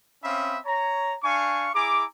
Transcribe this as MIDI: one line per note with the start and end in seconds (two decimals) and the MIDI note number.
0.24 0.58 60
0.24 0.58 61
0.24 0.58 76
0.24 0.58 77
0.24 0.58 83
0.24 0.58 87
0.66 1.15 73
0.66 1.15 82
1.23 1.69 62
1.23 1.69 77
1.23 1.69 80
1.23 1.69 85
1.75 2.05 64
1.75 2.05 68
1.75 2.05 80
1.75 2.05 82
1.75 2.05 86